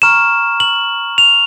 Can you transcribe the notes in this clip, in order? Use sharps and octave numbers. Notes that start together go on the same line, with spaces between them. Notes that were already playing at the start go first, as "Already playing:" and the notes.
A#5 C#6 F6 E7
F#7
F7